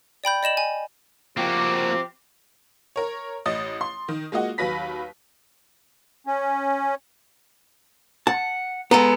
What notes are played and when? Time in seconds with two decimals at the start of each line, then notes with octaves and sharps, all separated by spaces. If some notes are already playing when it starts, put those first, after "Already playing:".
0.24 D5 G5 B5 G6
0.43 D5 D#5 E7 F#7
0.57 G#5
1.37 F3 A#3 C4 F#4 G4 D6
2.96 A#4 C#5
3.46 A1 D#5 D#6 A6
3.81 C6
4.08 D#3
4.32 G#3 A#3 F4 F#4 D#5 F#5
4.58 D#2 F#3 B4 B5 A#6 B6
6.27 C#4
8.27 F#5 A5
8.91 G#3 B3 A4 A#5